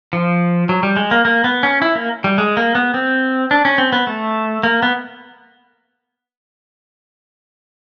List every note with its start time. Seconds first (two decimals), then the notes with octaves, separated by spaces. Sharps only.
0.13 F3
0.69 F#3
0.83 G3
0.97 G#3
1.11 A#3
1.25 A#3
1.44 B3
1.63 C#4
1.82 E4
1.95 A#3
2.24 G3
2.38 G#3
2.57 A#3
2.75 B3
2.94 C4
3.51 D4
3.65 C#4
3.78 C4
3.93 B3
4.07 A3
4.63 A#3
4.83 B3